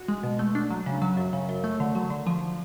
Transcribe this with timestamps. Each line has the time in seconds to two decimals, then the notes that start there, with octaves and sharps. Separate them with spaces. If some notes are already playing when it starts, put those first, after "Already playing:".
Already playing: F#4
0.08 G#3
0.23 B2
0.39 A3
0.55 D4
0.71 F#3
0.86 C#3
1.02 F#3
1.17 F#2
1.33 C#3
1.49 F#2
1.64 A3
1.80 D3
1.95 F#3
2.10 D3
2.27 F3